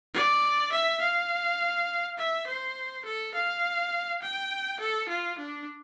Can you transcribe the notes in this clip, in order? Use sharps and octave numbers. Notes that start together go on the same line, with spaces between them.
D5
E5
F5
E5
C5
A4
F5
G5
A4
F4
D4